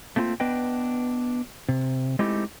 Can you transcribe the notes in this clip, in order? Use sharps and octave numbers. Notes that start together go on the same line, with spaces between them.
A3 A#3 C4 E4 F4
B3 D4 B4 D#5 G5
C3
G#3 A3 C4 D#4 E4 G4